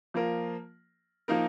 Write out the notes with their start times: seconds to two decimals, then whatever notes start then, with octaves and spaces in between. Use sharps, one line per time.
0.14 F3 A#3 F4 A#4
1.28 F3 A#3 D#4 A#4